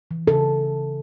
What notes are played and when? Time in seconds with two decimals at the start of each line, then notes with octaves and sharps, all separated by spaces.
0.11 E3
0.27 C#3 A4